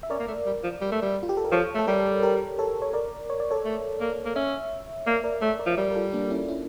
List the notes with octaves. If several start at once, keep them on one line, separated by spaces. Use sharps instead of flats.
E5
C#4 A#4 D5
A#3
A3
G3
F3
G3
A3
G3
F4
G4
A4
A#4
F3 A4 C#5
A3 A4
G3 G4 A#4
G4 A#4
A4 C#5
C#5
A#4 D5
C#5
D5
A4 C#5
A3
A#3
A#3
C#4 C#5 E5
A#3 A#4 D5
A#4 D5
A3 C#5 E5
A#4 D5
F3
G3 A#4 D5
A#4
F4 A4
A#3 D4
C#4 E4
C#4 E4